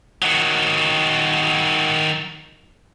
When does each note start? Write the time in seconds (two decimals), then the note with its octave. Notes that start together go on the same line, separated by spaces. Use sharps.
0.22 D#3 F#3